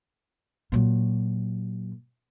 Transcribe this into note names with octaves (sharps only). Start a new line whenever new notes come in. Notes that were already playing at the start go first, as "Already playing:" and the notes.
A#2 F#3